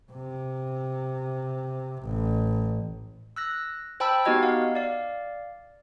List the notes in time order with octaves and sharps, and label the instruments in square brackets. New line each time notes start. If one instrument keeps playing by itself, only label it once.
[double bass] C3
A1
[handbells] E6 F#6 A#6
C5 G5 A5 B5 E6
B3 D#4 F#4 G4 D#5 G#6
F5 F#5
D5 F5